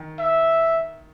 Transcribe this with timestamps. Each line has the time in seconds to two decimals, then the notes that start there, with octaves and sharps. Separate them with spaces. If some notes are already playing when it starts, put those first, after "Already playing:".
Already playing: D#3
0.19 E5